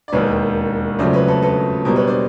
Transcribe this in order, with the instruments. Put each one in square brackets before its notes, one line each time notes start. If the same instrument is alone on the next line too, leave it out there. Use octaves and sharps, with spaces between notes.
[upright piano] D5
[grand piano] E1 D#2 D#3 [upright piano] B4 C#5
[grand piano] F2 C#3 F#3 A3 C4 [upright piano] C5 D5
[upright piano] B4 C#5
A4 B4
A4 B4
[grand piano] B2 G3 A#3 [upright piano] A#4 C5
[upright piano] B4 C#5
C5 D5